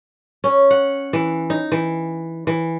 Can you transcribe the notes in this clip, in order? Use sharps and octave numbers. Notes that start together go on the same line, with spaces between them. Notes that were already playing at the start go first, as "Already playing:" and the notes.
C#4
F#5
E3
D#4
E3
E3